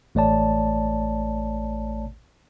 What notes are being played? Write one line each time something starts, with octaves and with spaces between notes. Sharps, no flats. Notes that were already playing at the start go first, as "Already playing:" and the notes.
A1 A3 C#5 D5 A5